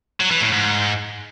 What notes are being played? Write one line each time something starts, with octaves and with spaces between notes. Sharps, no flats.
F#3
E3
A2
G#2